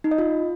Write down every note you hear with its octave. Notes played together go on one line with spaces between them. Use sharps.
D#4
D#5
F4